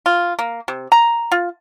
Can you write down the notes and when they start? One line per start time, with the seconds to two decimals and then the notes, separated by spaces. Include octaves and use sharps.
0.06 F4
0.39 A#3
0.68 C3
0.92 A#5
1.32 F4